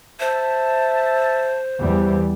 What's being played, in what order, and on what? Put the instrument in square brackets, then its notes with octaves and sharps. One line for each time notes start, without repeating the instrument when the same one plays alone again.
[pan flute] C5 [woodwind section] E5 A5
[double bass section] E2 E3 G3